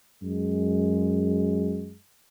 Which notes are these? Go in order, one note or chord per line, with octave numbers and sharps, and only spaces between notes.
F#2 G#3